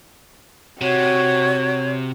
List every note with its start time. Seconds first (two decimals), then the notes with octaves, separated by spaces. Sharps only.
0.81 C3 F#4 C#5